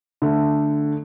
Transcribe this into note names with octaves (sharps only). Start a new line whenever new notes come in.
D3 A3